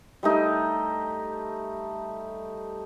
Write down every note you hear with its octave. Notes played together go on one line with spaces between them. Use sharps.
G3 A3 D#4